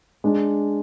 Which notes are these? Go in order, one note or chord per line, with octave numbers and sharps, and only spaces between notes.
G#3 D4